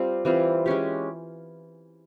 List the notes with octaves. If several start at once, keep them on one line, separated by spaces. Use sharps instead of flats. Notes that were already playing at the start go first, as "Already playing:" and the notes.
Already playing: G3 C4 F4
E3 G3 C4 F4
G#3 C#4 G4